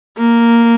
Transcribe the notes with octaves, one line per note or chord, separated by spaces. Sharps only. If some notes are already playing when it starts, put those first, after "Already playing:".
A#3